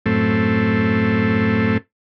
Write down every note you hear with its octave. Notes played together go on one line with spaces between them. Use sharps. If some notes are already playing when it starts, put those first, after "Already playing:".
F#2 A2 A3 C4